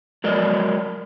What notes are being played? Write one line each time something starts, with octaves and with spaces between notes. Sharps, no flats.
F#3 G#3 A#4 D5 D#5